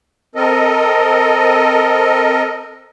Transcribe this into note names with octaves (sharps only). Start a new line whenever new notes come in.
C4 A4 A#4 D#5